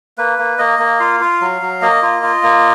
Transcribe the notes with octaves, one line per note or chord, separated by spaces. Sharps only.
A#3 B4
A#3
A#3 D#5
A#3
F4 F5
F4
F#3
F#3
A#3 D#5
F4
F4
A#3